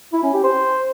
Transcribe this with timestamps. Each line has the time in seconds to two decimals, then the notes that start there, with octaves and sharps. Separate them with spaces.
0.13 E4
0.23 C#4
0.33 G4
0.44 C5